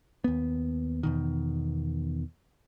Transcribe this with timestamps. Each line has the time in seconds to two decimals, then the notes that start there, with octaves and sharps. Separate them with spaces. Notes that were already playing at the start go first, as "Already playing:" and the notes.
0.24 D#2 B3
1.03 E2 B2 D#3